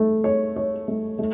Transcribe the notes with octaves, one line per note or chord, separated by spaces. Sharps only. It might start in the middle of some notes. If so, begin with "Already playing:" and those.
Already playing: A3
C#5
C#5
A3
A3